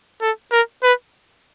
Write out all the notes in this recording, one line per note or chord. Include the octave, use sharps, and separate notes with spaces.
A4
A#4
B4